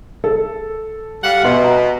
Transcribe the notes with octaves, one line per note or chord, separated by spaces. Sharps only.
A4
G3 F5 F#5
B2 E5 C6
A#5